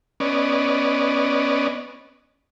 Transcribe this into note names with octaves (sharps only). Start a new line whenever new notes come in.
B3 C#4 D5 D#5